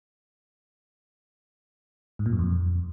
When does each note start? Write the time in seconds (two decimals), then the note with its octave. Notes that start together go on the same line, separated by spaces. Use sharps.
2.19 G#2
2.26 A#2
2.32 F#2
2.39 F2